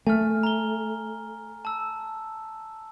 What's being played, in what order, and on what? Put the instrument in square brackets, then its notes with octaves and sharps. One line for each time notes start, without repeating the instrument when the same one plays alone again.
[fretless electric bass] A3 [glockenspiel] G#5 F6
[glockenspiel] A#5 G7
A5 E6